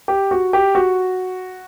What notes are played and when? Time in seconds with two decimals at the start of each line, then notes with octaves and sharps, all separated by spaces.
0.08 G4
0.31 F#4
0.53 G4
0.75 F#4